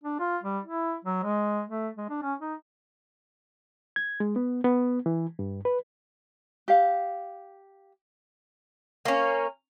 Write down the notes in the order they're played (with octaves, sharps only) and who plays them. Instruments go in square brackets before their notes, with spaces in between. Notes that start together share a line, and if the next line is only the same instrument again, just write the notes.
[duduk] D4
F4
G3
E4
F#3
G#3
A3
G#3
D4
C#4
D#4
[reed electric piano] G#6
G#3
B3
B3
E3
G2
B4
[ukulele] G4 F5
[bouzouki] A#3 C#4